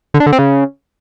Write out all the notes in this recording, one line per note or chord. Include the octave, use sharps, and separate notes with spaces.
D3
D4
D3
C4
C#3